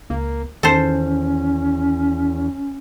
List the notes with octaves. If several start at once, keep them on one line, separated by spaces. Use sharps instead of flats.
C#2 A#3
E2 D#3 C#4 A4 C5